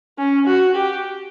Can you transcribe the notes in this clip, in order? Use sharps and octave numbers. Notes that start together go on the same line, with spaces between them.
C#4
F#4
G4